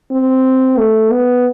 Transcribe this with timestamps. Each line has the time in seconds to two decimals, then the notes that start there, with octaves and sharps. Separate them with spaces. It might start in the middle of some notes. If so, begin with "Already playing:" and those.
0.11 C4
0.78 A3
1.11 B3